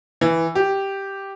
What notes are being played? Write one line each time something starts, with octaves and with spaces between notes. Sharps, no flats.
E3
G4